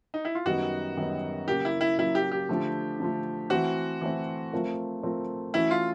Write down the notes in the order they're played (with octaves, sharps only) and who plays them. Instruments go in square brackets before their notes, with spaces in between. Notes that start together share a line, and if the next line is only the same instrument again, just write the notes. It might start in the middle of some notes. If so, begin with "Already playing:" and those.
[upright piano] D#4
E4
F4
[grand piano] F#2 D#3 G3 B3 D#4 [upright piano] F#4
[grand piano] F#2 D#3 G3 B3 D#4
[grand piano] C#3 F#3 A#3 [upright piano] G4
[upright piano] E4
E4
[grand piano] C#3 F#3 A#3 [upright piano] E4
[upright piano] G4
G4
[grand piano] D3 F3 A3
D3 F3 A3
[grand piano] E3 A3 C4 [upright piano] F#4
[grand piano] E3 A3 C4
F3 A3 C4 F4 A#4
F3 A3 C4 F4 A#4
[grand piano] E3 A3 C#4 F#4 [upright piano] E4
[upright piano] F4